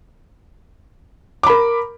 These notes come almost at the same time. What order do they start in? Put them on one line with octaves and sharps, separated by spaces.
D6 B5 A#4